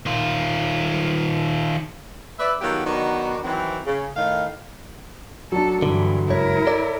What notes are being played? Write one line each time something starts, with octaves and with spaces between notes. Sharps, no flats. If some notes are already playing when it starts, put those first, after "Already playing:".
D#3 F4
B4 D5 E5
D#3 F#3 B3 F4 G4 A4
D#3 F#3 B3 D4 D#4 F#4
D#3 E3 F#3 C4
C#3
A2 D#3 F5
F#3 D4 A4
G2 D3 E3
C#2 F#2 E4 A#4 C#5
A4 C#5 D5